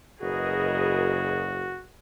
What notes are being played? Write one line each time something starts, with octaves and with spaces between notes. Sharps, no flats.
F#1 F#4 G#4 A#4 B4 D#5